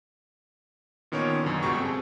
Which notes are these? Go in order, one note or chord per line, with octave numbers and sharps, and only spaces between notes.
A#2 D#3 B3 C#4 C#5 D7
F#2 B2 D3
G1 C#2 B2 G4 C#6
C4 G#4 A4